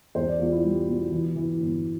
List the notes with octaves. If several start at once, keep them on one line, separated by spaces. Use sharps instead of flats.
E2 C5
D5
E2 F4
E4
G3
B2
E3
E3
G1